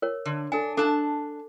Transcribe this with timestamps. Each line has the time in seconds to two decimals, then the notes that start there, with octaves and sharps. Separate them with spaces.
0.02 A#4 C#5
0.26 D3
0.52 D4 A4 G#5
0.77 D4 A4 A5 D6